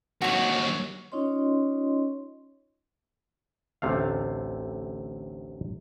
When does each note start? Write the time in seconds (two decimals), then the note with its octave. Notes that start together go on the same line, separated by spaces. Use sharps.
0.22 D#2 F#3 F#4 C#6
1.12 C#4 D#4 F4 C#5 D#5 C6
3.82 A1 D2 C3 A3 F5